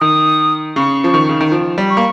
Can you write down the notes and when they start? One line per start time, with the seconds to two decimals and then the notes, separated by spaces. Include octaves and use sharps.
0.01 D#3 D#6
0.76 C#3 C#6
1.04 F3
1.14 D#3
1.29 C#3
1.41 D#3
1.52 F3
1.78 G3
1.90 C#6
1.97 A#3